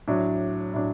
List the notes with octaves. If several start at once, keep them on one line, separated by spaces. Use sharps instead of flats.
A2 F#3 D4
A2 F#3 D4